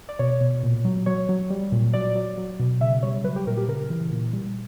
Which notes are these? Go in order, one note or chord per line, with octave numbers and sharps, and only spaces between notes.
D5
B2 C#5
B2
A#2
F#3
F#3 C#5
F#3
G3
A#2
F#3 D5
F#3
F#3
B2
C#3 E5
G3 C#5
F#3 B4
G4
A#2 A#4
G4
C#3 A#4
E3
A#2
G3